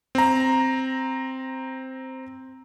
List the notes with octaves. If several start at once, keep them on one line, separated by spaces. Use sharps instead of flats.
C4 A#5